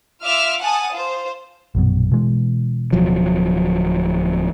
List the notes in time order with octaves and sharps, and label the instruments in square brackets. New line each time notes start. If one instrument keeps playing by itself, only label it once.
[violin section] F4 E5 D6 F6
F#5 G#5 A5 D#6
F4 C5
[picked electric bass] A#1 F#2 B2
B2 E3 G#3
[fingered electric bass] D1 F3 F#3